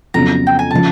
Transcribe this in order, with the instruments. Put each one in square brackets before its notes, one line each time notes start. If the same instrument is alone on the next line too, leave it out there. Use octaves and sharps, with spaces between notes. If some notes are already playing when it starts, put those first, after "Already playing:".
[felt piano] F2 C#3 F#3 B3 [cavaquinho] A#5
[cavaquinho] G5
G#5
[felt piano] C#3 F3 [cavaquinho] A5